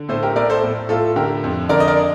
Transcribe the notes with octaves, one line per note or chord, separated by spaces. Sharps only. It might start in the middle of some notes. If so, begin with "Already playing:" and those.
Already playing: D3
A2 A4 C5
G4 A#4
A2 A#4 D5
A4 C5
A2
A2 F4 A4
D3 G4 A#4
F2
D3 A#4 D5
D#5
A#4 D5